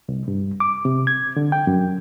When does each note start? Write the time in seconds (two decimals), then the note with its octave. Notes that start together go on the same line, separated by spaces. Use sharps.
0.09 C2
0.28 G2
0.60 D6
0.85 C3
1.07 G#6
1.36 D3
1.52 G5
1.67 F#2